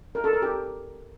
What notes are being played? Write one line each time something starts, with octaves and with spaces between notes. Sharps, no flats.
A#4
A4
A#4
G4